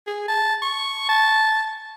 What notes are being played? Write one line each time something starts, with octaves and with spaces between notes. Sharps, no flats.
G#4
A5
C#6
A5